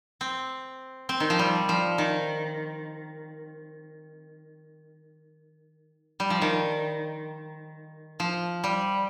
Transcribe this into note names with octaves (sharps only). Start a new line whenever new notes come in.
C4
C4
D#3
F3
G3
F3
D#3
G3
F3
D#3
F3
G3